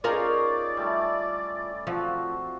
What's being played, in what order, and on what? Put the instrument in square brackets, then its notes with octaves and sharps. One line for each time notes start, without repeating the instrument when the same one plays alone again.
[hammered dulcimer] C#4 D#4 C#5 [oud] F4 G#4 A#4 [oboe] D5
[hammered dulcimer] G3 A3 E4
[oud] F3 [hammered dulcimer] C4 F#4